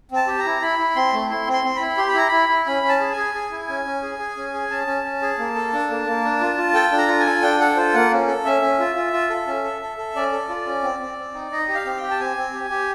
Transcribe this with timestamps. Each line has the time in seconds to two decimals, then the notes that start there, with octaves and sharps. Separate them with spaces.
0.11 C4 A5
0.27 G4
0.39 A#5
0.45 E4
0.62 E4 B5
0.79 E4
0.96 C4 C6
1.13 A3
1.30 E4 C6
1.47 C4
1.53 C6
1.64 C4
1.76 E4 B5
1.98 G4 C6
2.08 B5
2.14 E4 A#5
2.28 E4 B5
2.49 E4
2.66 C#4 B5
2.83 C#4
2.89 A5
3.00 G#4
3.12 G#4 G#5
3.34 G#4
3.51 E4
3.69 C#4
3.85 C#4
4.03 G#4
4.19 G#4
4.37 C#4
4.54 G#4
4.71 C#4 A5
4.87 C#4
5.04 C#4
5.22 G#4
5.39 A#3
5.55 A4
5.73 D4
5.90 A#3
6.07 A#3
6.24 D4
6.41 F4
6.58 F4
6.74 A4 G5
6.92 D4
6.98 A#5
7.08 F4
7.20 G#5
7.26 A4
7.42 D4 G5
7.60 A4 F#5
7.76 F4 C5
7.94 A#3 F#5
8.12 C#4
8.27 A4
8.45 C#4 E5
8.62 C#4
8.79 F4
8.95 F4
9.13 F4
9.30 A4
9.47 C#4
9.64 A4
9.82 A4
9.98 A4
10.16 C#4 D5
10.32 A4
10.49 F4
10.66 C#4
10.83 C4
11.00 C4
11.18 C4
11.34 D#4
11.51 D#4 D#5
11.69 G4
11.75 F5
11.85 C4
11.97 G5
12.03 G4
12.11 A5
12.20 C4 G#5
12.37 C4
12.54 G4
12.71 G4